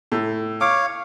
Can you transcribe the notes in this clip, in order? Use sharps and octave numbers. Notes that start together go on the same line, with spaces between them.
A2
C#5 F5 D6